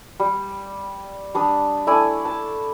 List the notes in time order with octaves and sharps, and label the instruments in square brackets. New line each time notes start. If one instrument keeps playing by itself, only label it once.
[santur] G3
G3 D4 D#6
A3 E4 D5 G#5
A5